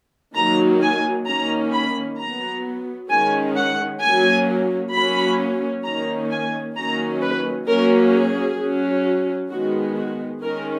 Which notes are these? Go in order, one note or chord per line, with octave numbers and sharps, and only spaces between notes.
D#3 F#3 A#3 A#5
G#5
D#3 A#3 C#4 A#5
B5
F#3 B3 A#5
D#3 G#3 C#4 G#5
F#5
F#3 A#3 C#4 G#5
F#3 A#3 C#4 B5
D#3 A#3 C#4 A#5
G#5
D#3 F#3 A#3 C#4 A#5
B4
F#3 A#3 C#4 A#4
G#4
F#3 C#4
D#3 G#3 B3 F#4
F#4
D#3 G#3 C#4 A#4